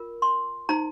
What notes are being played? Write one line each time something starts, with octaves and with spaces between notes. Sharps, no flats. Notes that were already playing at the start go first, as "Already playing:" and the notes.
Already playing: F4 A#4
C6
D#4 C5 A#5